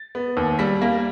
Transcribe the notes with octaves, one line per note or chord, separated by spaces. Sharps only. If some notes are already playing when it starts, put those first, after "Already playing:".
Already playing: A6
B3
D#2
G3 B6
A#3